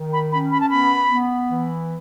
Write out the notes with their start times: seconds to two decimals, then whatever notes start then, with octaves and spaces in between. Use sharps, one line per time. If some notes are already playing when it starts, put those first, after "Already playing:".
Already playing: D#3
0.13 B5
0.32 C#4 B5
0.52 B5
0.61 A5
0.70 B3 B5
1.10 B3
1.50 E3